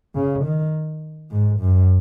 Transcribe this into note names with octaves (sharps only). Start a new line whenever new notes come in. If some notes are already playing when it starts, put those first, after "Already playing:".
C#3
D#3
G#2
F#2